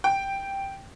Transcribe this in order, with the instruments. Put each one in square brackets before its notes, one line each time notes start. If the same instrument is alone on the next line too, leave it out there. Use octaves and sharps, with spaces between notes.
[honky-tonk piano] G5